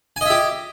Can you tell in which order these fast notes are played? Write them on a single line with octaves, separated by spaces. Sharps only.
G#5 D#5 E5 G4